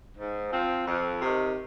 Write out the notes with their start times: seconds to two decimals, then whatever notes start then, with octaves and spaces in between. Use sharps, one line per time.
0.17 G#2
0.52 F3 C4
0.86 F2
1.21 C3 D#3